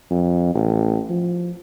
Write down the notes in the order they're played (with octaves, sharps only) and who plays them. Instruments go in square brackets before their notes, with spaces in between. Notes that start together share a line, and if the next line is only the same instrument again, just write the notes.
[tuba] F2
A1
F3